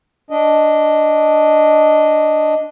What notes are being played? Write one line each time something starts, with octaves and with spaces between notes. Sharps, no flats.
D4 D#5